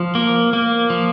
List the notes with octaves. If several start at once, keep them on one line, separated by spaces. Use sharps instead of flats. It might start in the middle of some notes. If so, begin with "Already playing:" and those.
Already playing: F3
A#3
A#3
F3